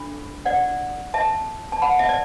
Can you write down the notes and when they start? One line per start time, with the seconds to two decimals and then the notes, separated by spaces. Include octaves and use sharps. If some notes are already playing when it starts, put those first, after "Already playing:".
Already playing: D4 A4 B5
0.45 D5 F#5
1.14 E5 A5
1.72 A5
1.82 F#5 B5
1.99 E5 A5
2.09 D5